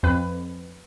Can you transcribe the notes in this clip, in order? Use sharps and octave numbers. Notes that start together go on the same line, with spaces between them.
F2 B4